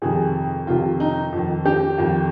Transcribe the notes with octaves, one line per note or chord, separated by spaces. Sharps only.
F2 C3 D#3 G#4
F2 C3 D#3 F4
D#4
F2 D#3
G4
F2 D#3